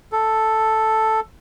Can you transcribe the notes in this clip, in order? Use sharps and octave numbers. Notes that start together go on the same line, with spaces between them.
A4